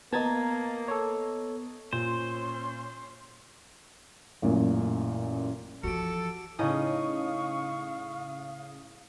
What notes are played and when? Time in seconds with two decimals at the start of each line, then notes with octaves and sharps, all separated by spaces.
0.13 A#3 B3 D#5 A5 A#5 G#6 A6
0.88 A4 C#5
1.93 A#2 C#4 C5 C6
4.42 A1 F#2 A#2
5.83 E3 F3 F#4 G4 A4 C#7 D7
6.59 A2 C#3 C#4 D#4 F5 C#6 D#6